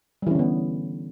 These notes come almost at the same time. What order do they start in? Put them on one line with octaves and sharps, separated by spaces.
G3 E3 C#4 D3 B3